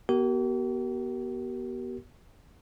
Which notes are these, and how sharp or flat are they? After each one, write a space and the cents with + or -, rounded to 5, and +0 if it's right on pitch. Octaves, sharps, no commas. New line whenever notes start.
B3 -30 G4 -45 A#4 +0